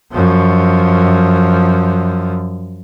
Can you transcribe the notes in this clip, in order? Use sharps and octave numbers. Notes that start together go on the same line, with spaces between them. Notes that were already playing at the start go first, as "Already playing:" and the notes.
F#2 F3